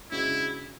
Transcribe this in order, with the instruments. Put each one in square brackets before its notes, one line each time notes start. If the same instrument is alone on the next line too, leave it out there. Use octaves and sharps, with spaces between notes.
[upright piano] C#3 G#3 D4 F#4 [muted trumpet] E4